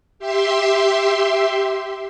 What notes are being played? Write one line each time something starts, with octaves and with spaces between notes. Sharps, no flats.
G4 E5 C6